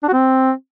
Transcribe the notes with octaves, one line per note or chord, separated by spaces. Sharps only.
D4
F#4
C4